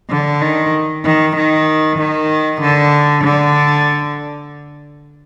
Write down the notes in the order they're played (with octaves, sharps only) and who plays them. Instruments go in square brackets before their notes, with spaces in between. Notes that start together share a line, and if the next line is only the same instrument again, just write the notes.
[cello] D3
D#3
D#3
D#3
D#3
D3
D3